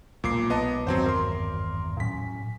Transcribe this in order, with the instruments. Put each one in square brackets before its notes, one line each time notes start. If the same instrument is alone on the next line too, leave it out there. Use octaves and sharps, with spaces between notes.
[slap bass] B1 G#3 [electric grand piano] A#2 D6 C7
[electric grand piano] B3 D#5 A5
[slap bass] G#1 E2 G2 [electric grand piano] F#3 C4 C5
[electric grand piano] A#4 C6
[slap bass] A2 F#3 C#4 [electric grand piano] B6